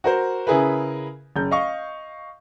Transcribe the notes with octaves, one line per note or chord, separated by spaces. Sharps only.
F#4 A#4 C5
C#3 E4 G#4 A#4 B4
F#1 G6
D#5 F5 C#6